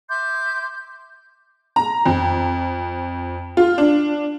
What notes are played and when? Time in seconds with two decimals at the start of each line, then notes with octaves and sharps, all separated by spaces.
0.09 E5 C6 D6 G6
1.76 A#5
2.06 F2
3.57 F4
3.78 D4